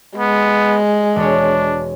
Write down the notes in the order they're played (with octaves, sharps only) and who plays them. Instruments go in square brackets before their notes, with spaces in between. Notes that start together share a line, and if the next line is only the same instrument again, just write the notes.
[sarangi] G#3 [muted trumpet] B3
[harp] E1 C#5 [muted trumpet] D4